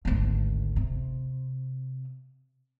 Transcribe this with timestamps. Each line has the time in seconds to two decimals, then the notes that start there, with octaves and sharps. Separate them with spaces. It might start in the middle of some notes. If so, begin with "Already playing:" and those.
0.05 G#1 D2
0.76 C3